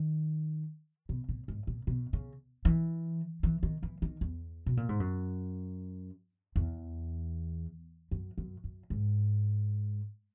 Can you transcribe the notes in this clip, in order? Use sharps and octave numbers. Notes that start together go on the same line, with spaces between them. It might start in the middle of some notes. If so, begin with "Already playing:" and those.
Already playing: D#3
B2
A#2
G#2
A#2
B2
C#3
E3
E3
D#3
E3
D#3
E2
B2
A#2
G#2
F#2
E2
F#2
F#2
F#2
G#2